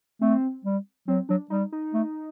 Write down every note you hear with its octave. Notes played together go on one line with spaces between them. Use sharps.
A3 C4
G3
F#3 C4
F#3 D4
G3 D#4
D#4
A3